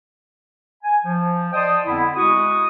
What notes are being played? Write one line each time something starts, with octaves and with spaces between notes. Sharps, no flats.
G#5
F3
D5 D#5 G5 A5 C6 D#6
F2 D3 B3 E4
G#3 E4 F#4 C#6 D#6